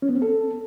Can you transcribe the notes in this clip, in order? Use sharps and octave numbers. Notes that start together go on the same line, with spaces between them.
C#4
B3
C4
A4